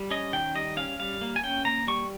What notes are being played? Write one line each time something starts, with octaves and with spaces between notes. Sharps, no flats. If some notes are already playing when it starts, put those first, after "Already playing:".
Already playing: G3
C#4 D#5
D#3 G5
G3 D#5
C#4 F5
G3 F5
A#3
G#5
C#4 G5
A#3 A#5
G3 C#6